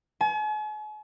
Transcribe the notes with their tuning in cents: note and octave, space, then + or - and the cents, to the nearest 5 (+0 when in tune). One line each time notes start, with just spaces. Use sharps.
G#5 +45